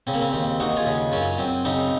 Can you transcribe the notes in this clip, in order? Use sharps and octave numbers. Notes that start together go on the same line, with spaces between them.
C#3 C4
A#3
C4
D#2 C4
D#2 D#4 F#4
F4 G#4
C#3
F#2 C#4 F4
F#2 C4
C#3 C4 D#4